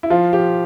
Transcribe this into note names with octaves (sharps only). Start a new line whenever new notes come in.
E4
F3 F4
F3 G4